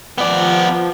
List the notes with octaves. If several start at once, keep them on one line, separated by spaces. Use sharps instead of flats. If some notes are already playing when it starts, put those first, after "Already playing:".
F3 B3 D5